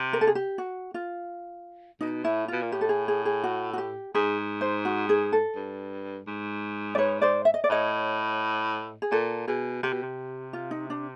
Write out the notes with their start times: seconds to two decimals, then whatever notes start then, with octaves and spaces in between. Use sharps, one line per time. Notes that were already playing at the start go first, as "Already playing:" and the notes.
Already playing: C3
0.13 A#4
0.21 A4
0.27 G#4
0.35 G4
0.58 F#4
0.94 F4
2.01 B2 D#4
2.24 A2 E4
2.48 B2 F4
2.62 A#2
2.72 A2 G4
2.81 A4
2.89 G#4
3.08 G#4
3.26 G#4
3.44 F#4
3.73 F#4
3.78 G4
4.15 G#2 G#4
4.61 C5
4.85 F#4
5.09 G#4
5.33 A4
5.56 G2
6.27 G#2
6.95 D5
6.98 B4 C#5
7.22 C5 D5
7.45 E5
7.54 D#5
7.64 D5
7.69 A2 C#5 D#5
9.02 G#4
9.11 A#2 A4
9.47 B2 G#4
9.83 C3 G4
9.93 B2
10.03 C3
10.53 F4
10.71 D#4
10.90 D4